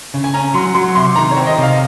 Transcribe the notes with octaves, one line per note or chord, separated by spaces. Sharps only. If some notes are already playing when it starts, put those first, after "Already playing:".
C#3
G#5
C#4 A#5
F#3 C6
F#3 C6
C3 C6
D#3 A#5
C#5
C4
D#5
C3 F5